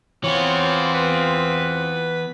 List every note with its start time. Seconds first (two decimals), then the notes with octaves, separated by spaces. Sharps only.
0.24 E3 B3 C4 F4 C#5
0.95 B4